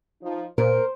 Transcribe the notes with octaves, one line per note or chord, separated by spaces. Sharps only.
F3 D#4
A#2 A#4 C5